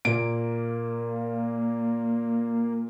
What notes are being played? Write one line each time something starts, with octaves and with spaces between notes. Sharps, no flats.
A#2 A#3 D7